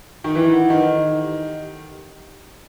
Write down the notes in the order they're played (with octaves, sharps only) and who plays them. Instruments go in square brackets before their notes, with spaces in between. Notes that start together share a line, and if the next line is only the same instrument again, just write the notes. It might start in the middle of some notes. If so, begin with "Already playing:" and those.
[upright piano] D#3
[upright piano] E3 [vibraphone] E4
[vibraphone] F#5
[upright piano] D#3 [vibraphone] D#5
[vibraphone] A4
D#5
G4